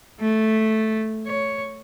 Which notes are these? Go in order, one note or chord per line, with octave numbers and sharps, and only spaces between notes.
A3
C#5